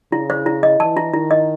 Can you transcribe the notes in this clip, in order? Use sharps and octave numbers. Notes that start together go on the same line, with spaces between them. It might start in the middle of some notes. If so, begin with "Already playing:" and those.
C#3 E4
C5
E4
D#5
E3 A5
E4
D#3 E4
D#5